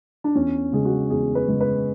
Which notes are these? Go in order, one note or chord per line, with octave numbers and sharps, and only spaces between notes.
D4
E2 C#4
C#3 G#3 G#4
F#4
E2 G#4
B4
C#3 G#3
B4